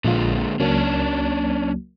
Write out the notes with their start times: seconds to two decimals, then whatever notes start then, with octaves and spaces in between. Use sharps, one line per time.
0.05 A#1 A#2 D3 G#3 F4
0.60 C#2 F#3 A#3 C#4 D4